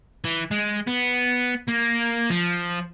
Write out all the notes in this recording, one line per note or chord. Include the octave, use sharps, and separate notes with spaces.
E3
G#3
B3
A#3
F3